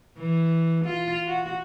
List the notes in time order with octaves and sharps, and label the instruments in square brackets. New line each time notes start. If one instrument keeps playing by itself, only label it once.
[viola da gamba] E3
F4
F#4